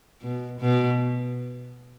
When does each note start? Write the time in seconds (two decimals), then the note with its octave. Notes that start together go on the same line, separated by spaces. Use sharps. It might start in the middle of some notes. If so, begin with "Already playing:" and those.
0.22 B2
0.60 B2